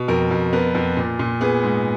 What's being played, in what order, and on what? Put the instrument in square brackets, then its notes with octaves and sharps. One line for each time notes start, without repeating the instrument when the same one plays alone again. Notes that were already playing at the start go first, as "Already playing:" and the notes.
Already playing: [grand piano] B2
F2 A#4
F2
B3 A#4
F2
A#2
A#2
B3 G#4
G#2